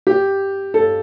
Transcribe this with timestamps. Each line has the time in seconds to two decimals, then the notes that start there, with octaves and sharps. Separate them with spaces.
0.07 G4
0.74 A4